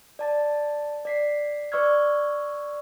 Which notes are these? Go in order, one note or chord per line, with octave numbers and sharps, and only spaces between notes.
D5 A5 A6
D5 B6 C7
B4 D5 C#6 E6 F6 G#6